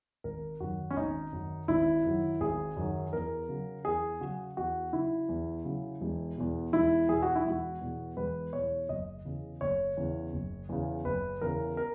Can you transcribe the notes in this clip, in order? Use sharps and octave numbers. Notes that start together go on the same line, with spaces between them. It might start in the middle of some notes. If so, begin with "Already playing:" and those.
G#1 A#4
F#2 D#3 F#3 F#4
C#4
G#1 D#4
F#2 D#3 F#3
G#1 E4
F#2 D#3 F#3
G#1 G#4
F#2 D#3 F#3
E2 A#4
C#3 F#3
E2 G#4
C#3 F#3 F#4
E2 F#4
C#3 F#3 E4
E2
C#3 F#3
E1
E2 B2
E1 E4
E2 B2 G#4
F#4
E4
E1 F#4
E2 B2
E1 B4
E2 B2 C#5
F#1 D#5
E2 C#3
F#1 C#5
E2 C#3
F#1
E2 C#3
F#1 B4
E2 C#3 A#4
A#4